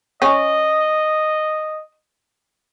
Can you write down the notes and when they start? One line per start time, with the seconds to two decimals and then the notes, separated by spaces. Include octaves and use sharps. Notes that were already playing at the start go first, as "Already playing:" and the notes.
0.22 C#4 D#5